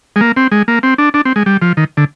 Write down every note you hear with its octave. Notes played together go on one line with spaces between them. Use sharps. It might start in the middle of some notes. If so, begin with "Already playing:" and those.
G#3
A#3
C4
G#3
A#3
C4
D4
D4
C4
G#3
G3
F3
D#3
D3